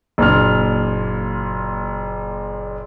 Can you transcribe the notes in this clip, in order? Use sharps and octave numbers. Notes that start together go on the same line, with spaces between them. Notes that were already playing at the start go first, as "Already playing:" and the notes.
F#1 A#2 D4 F6